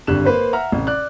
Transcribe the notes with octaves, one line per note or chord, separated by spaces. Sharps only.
G#1 G2 D3 G4 F#6 E7
A#3 B4 C5
E5 F#5 A#5 F6
A1 C3
D5 F#6